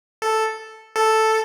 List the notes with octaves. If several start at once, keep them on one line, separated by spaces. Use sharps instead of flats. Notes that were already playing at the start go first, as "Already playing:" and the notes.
A4
A4